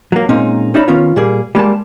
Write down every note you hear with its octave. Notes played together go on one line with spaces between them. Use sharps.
F#3 A#3
A#2 G#3 A#3 C4 C#4 D#4
C#4 D#4 D5 E5 A#5 B5
D#3 B3 C#4 F4
A#2 G3 A#3 G#4
G3 G#3 A#3 A5